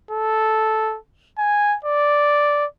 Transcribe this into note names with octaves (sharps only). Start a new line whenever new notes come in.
A4
G#5
D5